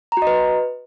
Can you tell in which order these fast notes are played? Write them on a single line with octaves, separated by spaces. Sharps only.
A#5 F#4 D#5 B4